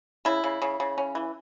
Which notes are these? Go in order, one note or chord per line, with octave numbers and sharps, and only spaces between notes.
C#3 E4
C#3
C#3
C#3
C#4
E3